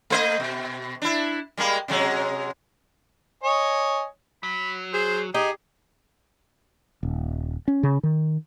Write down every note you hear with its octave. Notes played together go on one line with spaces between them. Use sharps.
A3 C5 D#5
B2
D4 E4
G3 G#3 A#3
C3 F#3 G#3
C#5 D#5 G#5
F#3 B5
G#4 C5
D#4 G4 G#4
D#1
C#4
C#3
D#3